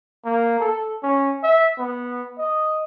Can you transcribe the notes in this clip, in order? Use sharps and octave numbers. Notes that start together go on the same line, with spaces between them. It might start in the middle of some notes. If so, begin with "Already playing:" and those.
A#3
A4
C#4
E5
B3
D#5